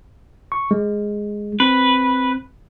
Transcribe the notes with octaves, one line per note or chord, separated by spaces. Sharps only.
C#6
G#3
C4 B4